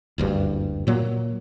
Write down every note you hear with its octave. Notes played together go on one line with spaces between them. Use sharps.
F#1 D2 G2
A#2 F#3 A#3